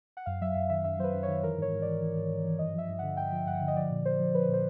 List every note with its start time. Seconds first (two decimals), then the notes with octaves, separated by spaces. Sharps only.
0.17 F#5
0.26 F#2 F5
0.41 F#3 E5
0.56 F#2
0.70 D#3 E5
0.84 F#2 E5
0.99 F#3 C5
1.04 B4
1.14 F#2
1.23 C#5
1.28 D#3
1.43 E3 A#4
1.57 G#2 C#5
1.72 G#2
1.82 E3 D5
2.01 E3
2.16 G#2
2.31 G#2
2.44 E3
2.59 G2 D#5
2.74 F3 E5
2.89 G2
2.99 D3 F#5
3.17 G2 G5
3.32 F3
3.46 G2 F#5
3.61 D3
3.68 D#5
3.76 F3 D5
3.90 A#2
4.05 A#2 C5
4.20 F3
4.34 F3 B4
4.49 A#2
4.54 C5